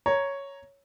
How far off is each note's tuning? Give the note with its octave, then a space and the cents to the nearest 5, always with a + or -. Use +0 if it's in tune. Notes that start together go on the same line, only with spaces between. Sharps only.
C#5 +0 A#5 +0